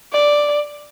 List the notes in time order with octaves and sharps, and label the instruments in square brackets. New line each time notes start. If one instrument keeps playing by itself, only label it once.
[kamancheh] D5